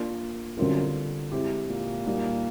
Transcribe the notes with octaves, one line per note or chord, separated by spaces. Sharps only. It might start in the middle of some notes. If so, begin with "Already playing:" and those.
Already playing: A#3 D4 F4 A#4
F#2 D3 G3 C4 F4 A#4
G#3 C4 E4 G4
A#2
G3 A#3 D#4 F#4